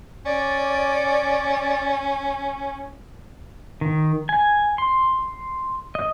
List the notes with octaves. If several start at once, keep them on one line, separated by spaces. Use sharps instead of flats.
C#4 D5
D#3
G#5
C6
D#5